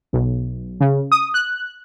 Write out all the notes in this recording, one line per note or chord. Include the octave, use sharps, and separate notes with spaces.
B1
C#3
D#6
F#6